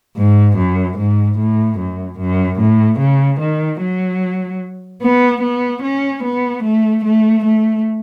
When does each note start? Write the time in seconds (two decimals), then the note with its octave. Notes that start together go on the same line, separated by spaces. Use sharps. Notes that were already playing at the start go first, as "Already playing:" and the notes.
0.17 G#2
0.58 F#2
0.99 G#2
1.39 A2
1.79 F#2
2.19 F#2
2.59 A2
3.00 C#3
3.40 D#3
3.81 F#3
5.02 B3
5.42 B3
5.83 C#4
6.24 B3
6.64 A3
7.04 A3
7.45 A3